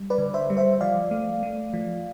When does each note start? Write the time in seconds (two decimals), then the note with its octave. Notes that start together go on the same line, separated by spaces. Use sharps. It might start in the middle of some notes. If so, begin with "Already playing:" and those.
Already playing: G3
0.10 B4 D5
0.18 D3
0.34 C5 E5
0.50 G3
0.57 C5 E5
0.81 F3 D5 F5
1.11 A3
1.43 A3
1.73 F3